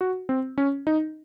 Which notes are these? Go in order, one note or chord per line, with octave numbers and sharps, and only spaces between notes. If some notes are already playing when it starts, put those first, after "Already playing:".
F#4
C4
C#4
D#4